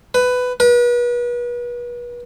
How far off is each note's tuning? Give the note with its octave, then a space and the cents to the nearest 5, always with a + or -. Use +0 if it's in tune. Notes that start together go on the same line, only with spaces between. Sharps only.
B4 +15
B4 -35